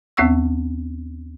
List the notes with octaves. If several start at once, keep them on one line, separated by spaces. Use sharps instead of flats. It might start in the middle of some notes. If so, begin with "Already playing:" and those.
D#2 B3 C4 F#5 C#6 E6